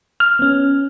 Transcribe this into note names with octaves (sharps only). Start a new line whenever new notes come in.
F6
B3 C#4